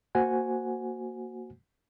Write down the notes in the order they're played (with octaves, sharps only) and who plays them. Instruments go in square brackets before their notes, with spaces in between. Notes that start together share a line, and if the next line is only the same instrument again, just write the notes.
[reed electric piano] A#3 F#4 C5 F#5 G#5